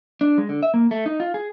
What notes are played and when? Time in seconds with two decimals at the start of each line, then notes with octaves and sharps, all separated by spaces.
0.21 D4
0.38 G#3
0.49 D3
0.63 E5
0.74 A#3
0.91 A3
1.06 D#4
1.20 F4
1.34 G#4